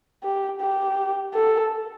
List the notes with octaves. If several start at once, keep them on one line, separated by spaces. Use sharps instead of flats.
G4
G4
A4